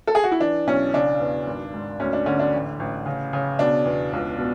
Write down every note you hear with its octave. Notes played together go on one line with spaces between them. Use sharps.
A4
G#4
F#4
E4
E3 D4
B1 C#4
C#3 D4
E2
G#1
G#2
D2 C#4
D4
D3 C#4
D4
A1
A1
C#3
C#3
B2 D4
E2
C#2
B2